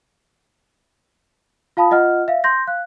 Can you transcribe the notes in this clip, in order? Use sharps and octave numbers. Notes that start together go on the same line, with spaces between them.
F4 F5 A5 B5 D#6
F4 D#5 F#5 F6
E5 F5
C6 G6 A#6
F5 F#6